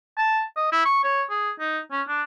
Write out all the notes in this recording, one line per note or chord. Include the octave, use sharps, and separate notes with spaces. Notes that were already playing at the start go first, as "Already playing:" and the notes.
A5
D#5
E4
C#6
C#5
G#4
D#4
C#4
D4